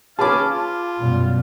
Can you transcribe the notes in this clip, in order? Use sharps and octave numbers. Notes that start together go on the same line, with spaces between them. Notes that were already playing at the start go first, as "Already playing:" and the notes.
C#4 G#4 B4 F5 A5 D6 F6
F4
F#2 B2 G3